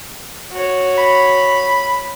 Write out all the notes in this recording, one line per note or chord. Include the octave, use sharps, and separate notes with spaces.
F#4 C#5
B5